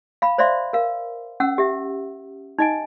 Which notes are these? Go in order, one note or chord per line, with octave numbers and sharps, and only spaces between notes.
F5 B5
C5 D5 E5 F5 C6
A#4 F5
C#4 F#5 E6
G4 E5
D#4 D#5 G#5